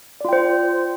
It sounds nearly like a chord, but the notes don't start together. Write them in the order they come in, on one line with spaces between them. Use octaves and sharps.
D5 F4 G5 C5